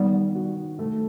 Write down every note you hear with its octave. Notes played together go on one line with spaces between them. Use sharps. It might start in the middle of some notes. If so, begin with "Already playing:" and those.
Already playing: D#3 G3 B3
F#4
A3